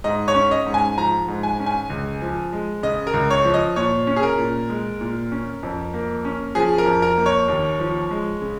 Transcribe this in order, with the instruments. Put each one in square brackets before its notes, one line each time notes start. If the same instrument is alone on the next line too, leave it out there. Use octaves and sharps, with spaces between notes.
[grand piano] G#2 D#5
C#5
C#4
D#5
G#2
G#5
F3 A#5
G#2
G#5
C#4
G#5
C#2
F3
G#3
C#3 D#5
A#4
C#2
C#5
F3
D#5
A#2 C#5
C#4
G#4
A#4
A#2
G#3
A#2
C#4
F2
A#3
C#4
F3 G#4
A#4
F2
A#4
A#3
C#5
D#2
F3
G#3
C#3